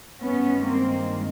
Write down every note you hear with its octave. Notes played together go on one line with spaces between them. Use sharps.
G2 D#3 G#3 B3 C#4
A#3 C4